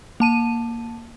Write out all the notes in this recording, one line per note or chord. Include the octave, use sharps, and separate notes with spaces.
A#3 A5 D#7